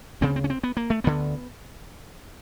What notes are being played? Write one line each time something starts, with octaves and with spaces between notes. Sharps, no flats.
D2 C#3 C4
C4
C#4
C4
B3
A#3
A3
D2 D3 B3